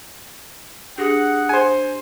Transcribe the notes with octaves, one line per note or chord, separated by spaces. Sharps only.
D4 G4 G#4 F#5 A#6
C5 G#5